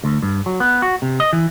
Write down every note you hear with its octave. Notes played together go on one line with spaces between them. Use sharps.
D2
G2
F#3
B3
F#4
C3
D#5
E3